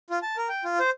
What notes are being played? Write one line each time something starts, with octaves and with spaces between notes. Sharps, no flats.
F4
A5
A#4
G5
F4
C5